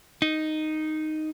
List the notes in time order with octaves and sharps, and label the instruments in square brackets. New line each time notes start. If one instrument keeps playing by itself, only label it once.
[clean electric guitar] D#4